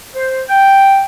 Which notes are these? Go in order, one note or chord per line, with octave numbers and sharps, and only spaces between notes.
C5
G5